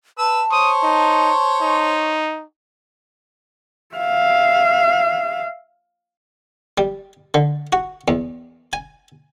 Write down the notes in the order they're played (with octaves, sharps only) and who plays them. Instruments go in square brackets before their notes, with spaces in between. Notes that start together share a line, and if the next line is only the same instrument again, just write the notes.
[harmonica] B4 E6 [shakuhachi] A5
[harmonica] C5 C#5 C#6 [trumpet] D#6
[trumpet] D#4
D#4
[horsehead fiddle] E5 F5
[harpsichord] G3
D3
F#4
E2
G#5